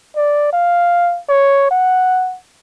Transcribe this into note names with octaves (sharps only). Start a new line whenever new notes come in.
D5
F5
C#5
F#5